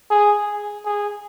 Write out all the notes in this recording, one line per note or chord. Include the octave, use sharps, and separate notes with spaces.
G#4
G#4